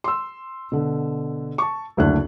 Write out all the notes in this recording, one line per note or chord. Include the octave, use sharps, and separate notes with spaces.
C6 E6
B2 D3
A5 C#6
F#1 D2 D4 F#6